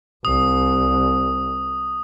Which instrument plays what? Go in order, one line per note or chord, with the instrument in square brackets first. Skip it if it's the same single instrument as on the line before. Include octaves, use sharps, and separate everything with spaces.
[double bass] C2 [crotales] D#6